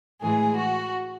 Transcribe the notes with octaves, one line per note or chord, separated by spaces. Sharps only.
A2 E3 G#3 G#4
F#4